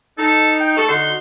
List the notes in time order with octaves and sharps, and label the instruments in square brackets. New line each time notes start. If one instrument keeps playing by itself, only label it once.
[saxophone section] D#4 [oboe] A4
[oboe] G5
[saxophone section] A4 [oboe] C#6
[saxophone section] D3 D#4 F#4 [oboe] C6